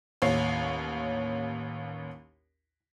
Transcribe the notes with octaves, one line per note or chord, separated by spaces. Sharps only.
A1 D#2 C#5 C7